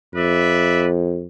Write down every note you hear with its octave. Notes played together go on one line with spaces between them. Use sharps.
F2 B4 D5 E5